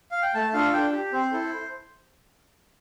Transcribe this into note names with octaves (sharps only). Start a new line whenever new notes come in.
F5
G5
A3 A5
D4 F4 A4 F5
D4 G5
G4
C4 C5
E4 A4